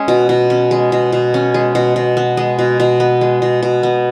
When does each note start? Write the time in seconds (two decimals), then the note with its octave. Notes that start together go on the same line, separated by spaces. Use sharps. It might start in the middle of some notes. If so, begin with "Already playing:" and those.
Already playing: G#3 C#4
0.08 B2
0.29 B2
0.50 C#4
0.71 G#3
0.92 B2
1.12 B2
1.34 C#4
1.54 G#3
1.75 B2
1.96 B2
2.17 B3
2.37 G#3
2.59 B2
2.80 B2
3.00 B3
3.21 G#3
3.42 B2
3.63 B2
3.83 B3